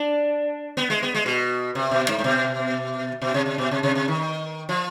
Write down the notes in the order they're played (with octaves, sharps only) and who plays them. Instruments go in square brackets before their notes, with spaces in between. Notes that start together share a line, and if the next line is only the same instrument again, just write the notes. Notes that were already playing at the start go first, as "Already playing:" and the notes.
Already playing: [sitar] D4
B3
G#3
B3
G#3
B2
C3
B2
G#2
G#2
B2
B2
C3
C3
B2
C3
C3
C3
D#3
F3